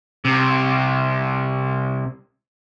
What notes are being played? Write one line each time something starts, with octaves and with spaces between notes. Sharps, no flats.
C2 C3